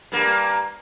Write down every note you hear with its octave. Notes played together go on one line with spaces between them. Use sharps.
G2 A#3